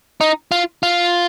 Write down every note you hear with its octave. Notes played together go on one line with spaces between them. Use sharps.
D#4
F4
F4